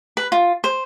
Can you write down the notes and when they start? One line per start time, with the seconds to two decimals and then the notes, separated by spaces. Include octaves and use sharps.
0.17 B4
0.32 F4
0.64 C5